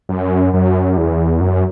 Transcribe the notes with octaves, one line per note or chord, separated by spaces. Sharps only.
F#2
F#2
E2
F#2